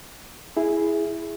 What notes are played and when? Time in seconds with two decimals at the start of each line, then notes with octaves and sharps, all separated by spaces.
0.57 E4 G#4